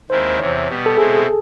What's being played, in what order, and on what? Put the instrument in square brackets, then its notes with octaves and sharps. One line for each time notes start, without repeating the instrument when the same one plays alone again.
[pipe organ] D#2 D#3 G#3 C4 E4 [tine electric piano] C5
[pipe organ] E2 C3 E3 [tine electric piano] C#5
[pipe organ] B2 G3 B3
[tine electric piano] A4
[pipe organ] B2 G#3 C4 E4 [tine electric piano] G#4